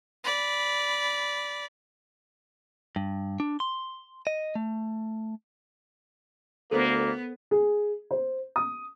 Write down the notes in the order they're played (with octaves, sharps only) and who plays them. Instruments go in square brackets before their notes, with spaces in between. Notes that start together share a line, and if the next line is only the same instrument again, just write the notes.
[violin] D5 B5
[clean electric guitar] G2
D4
C6
D#5
A3
[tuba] D2 [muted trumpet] A#3 [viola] B3 [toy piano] A4 A#4 C5
[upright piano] G#4
C5
D#6